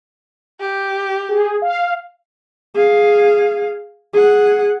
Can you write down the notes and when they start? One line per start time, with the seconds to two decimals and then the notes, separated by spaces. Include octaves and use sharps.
0.60 G4
1.29 G#4
1.62 F5
2.75 G#4 F5
4.13 G#4 F#5